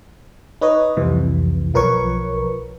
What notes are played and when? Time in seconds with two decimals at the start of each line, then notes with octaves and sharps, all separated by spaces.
0.61 D#4 B4 C#5 D#5
0.97 C2 F2 C3 E3
1.74 B1 F3 A#4 B4 C#5 C#6